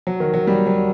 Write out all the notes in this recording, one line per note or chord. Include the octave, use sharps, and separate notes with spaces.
F#3
D#3
F#3
G3
F#3